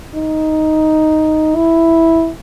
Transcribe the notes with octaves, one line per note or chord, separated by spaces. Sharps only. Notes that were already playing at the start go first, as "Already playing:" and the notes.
D#4
E4